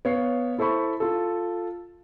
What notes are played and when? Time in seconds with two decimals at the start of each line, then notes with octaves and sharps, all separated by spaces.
0.05 B3 C#5 F5 C7
0.58 E4 A4 C5 B5 C#6
1.00 F4 A4